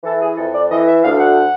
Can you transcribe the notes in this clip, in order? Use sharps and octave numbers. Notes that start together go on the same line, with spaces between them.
E3 A4
G#4
F2 A4
D5
E3 D#5
E5
D2 F5
F#5